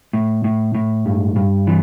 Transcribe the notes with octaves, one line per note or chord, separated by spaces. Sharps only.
A2
A2
A2
G2
G2
E3